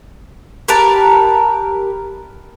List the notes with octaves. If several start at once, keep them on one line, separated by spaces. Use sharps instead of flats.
G4 A#4 B4 A5